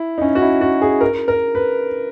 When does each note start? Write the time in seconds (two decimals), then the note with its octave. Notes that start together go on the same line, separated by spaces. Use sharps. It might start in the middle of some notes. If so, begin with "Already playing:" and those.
Already playing: E4
0.18 D#4
0.22 C#4
0.35 F#4
0.42 E4
0.61 F#4
0.82 G#4
1.01 A#4
1.28 A#4
1.55 B4